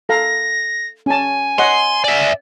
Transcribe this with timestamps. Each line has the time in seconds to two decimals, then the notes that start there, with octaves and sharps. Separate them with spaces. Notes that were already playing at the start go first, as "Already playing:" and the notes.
0.09 A4 F5 A#5 A#6
1.06 C#4 G#5 A5
1.58 C#5 D#5 F#5 C6
2.04 D5 E5